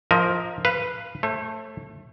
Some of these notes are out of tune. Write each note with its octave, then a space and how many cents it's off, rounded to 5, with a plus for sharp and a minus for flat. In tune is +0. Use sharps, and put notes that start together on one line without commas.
F3 +0 A#4 +0 D#5 +35
B4 +0 F5 -20
A3 +10 C#5 -45